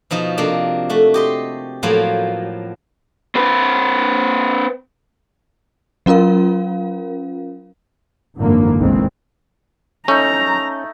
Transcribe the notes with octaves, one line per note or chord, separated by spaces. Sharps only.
B2 F3 D#4
C3 A#3 D4
A3 F#4
G4 D#5 C6
A2 F3 F#3 A#3 C5
C4 B4
F#3 C#4 F4 A#4 F5
G#1 F#2 D3 E3 F3 A#3
F1 B1 D#3 E3 G#3 C4
A3 C#4 D#4 A#5